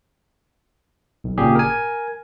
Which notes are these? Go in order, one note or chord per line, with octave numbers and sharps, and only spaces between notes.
B1
G#1 A#2 C#3 G4 G#4
A#4 G#5